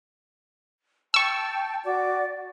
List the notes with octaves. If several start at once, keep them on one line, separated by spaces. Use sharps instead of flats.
G5 A5 C#6 E6
F#4 D5 D6